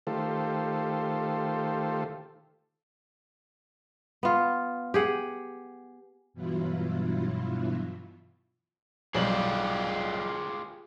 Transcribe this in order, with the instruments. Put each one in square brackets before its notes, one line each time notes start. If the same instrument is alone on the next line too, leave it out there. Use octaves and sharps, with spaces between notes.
[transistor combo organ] D#3 A3 F4 G4 A4 C5
[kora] B3 F4
G4 G#4 F#5
[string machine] G2 B2 E3 F#3 E4 F4
[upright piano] B1 G3 F#7 [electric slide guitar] F4 G4 G#4